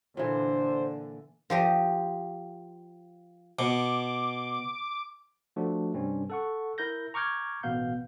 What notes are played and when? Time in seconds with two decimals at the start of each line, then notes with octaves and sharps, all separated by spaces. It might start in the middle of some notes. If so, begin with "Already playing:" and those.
0.17 A#2 D3 E3 C5
1.50 F3 G4 D#5
3.59 B2 D6
5.56 F3 A3 D4 F#4
5.94 G2 C3 C4 C#4
6.30 A4 F#5 C#6
6.78 E4 A#4 G6 A#6
7.14 A#5 C#6 D6 F6 G6 G#6
7.63 A1 B2 B3 F5 G6